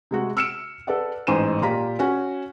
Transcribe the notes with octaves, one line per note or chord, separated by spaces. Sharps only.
C3 G#3 F#4
E6 F6 C#7 D7 E7
A4 B4 D5 F#5
A1 G#2 C5 G#5 D#7 E7
A#2 F4 G4 A#5 B6
C#4 F#4 G#5